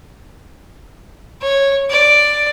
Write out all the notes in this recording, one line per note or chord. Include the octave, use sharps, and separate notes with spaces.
C#5
D5